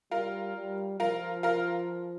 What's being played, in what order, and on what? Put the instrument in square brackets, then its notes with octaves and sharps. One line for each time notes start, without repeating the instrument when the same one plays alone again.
[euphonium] G3 [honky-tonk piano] F4 A#4
[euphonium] G3
[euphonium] F3 [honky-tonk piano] F4 A#4
[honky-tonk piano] F4 A#4